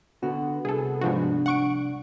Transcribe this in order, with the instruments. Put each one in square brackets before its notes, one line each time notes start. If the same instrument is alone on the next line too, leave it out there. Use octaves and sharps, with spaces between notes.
[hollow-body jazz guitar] D3 F#4 [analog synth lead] B3
[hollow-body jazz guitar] C2 [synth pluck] G#4 A4
[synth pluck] G#2 F3 F#4 [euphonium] D4
[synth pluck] F#5 C#6 D7